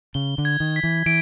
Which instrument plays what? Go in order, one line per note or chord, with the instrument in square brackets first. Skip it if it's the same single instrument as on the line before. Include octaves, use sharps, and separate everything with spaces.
[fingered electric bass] C#3 [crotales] G7
[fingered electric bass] D3
[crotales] G#6
[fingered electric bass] D#3
[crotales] B6
[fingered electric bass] E3
[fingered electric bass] E3 [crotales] D7